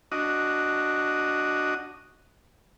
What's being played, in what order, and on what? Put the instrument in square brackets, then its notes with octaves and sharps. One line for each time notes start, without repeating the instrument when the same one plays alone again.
[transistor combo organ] D4 F#4 D#5